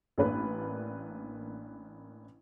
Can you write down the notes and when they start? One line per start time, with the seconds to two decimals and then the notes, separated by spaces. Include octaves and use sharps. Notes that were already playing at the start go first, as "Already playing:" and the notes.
0.18 A1 A#3 D4 B4